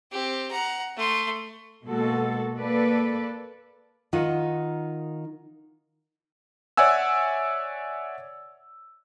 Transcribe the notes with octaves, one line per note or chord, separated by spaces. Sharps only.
C4 G4
F#5 A#5
A3 C6
B2 G#3 A#3 F#4 A4
A#3 A4 B4 D5
D#3 D#4 F4 F#5
C#5 D5 E5 F#5 G#5 E6